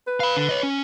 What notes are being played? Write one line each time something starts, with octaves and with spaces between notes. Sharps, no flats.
B4
F5 B5
D3
C#5 D#5
C#4